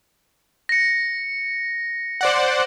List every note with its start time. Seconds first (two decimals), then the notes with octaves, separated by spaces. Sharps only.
0.69 A#6 C#7
2.21 C5 D5 F#5